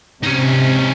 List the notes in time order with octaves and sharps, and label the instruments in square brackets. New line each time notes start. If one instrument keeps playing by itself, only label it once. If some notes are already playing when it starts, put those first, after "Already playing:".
[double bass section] C3 [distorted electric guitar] C#4 D#4